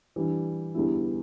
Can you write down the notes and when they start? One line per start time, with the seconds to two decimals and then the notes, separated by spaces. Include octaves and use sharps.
0.16 E3 G3 D4
0.75 E2 D3 G3 B3 E4